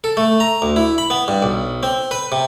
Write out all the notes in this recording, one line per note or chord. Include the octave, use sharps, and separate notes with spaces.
A4
A3
A#5
D2
E4
B5
B3
G2
B1
C4
B4
C3